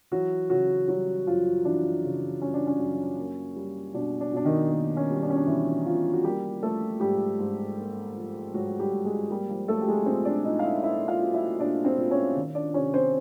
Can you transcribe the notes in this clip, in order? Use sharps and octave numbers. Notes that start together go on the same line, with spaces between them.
E3 F#3 F#4
C#3 F#3 F#4
F#3 G3 F#4
F#2 F3 F4
E3 D4
C#3
G3 C#4
D4
C#4
F#2
A#3
G3
B2 D4
D4
B2 D4
D#3 D#4
A#3
C#4
G3
D4
C#4
D4
B2 E3 E4
B2 F3 F4
F#4
G3 A#3 G4
F3 A3 A4
G#2 G3 G4
G#2
A#3
F3
G#2 F#3 F#4
G3 G4
G#2
G#3 G#4
G3 A#3 G4
F3 F4
F#3 A3 A4
G4
G#3 G#4
A#2 C4 C5
D4 D5
A#2 D#4 D#5
F5
E4 E5
A#3 E4 E5
F4 F5
F#3
E4 E5
A#2 D4 D5
C4 C5
A#2
C#4 C#5
D#3
D4 D5
C3 C#4 C#5
C4 C5